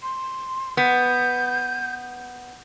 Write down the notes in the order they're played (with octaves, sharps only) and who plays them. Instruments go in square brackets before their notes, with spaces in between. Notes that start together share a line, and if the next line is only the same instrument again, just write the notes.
[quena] C6
[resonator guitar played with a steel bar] B3 [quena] G6